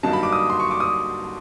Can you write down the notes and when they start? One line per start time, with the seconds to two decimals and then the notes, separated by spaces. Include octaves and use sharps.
0.03 G2 D3 F#3 A#3 D#4 A5
0.13 B5
0.23 D6
0.32 D#6
0.50 C6
0.60 C#6
0.71 D6
0.80 D#6